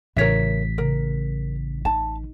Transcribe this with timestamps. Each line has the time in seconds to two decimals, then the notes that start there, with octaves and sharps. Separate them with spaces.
0.17 A1 C#3 A#4 C#5 E5 B6
0.78 C#3 A#4
1.85 D#4 A5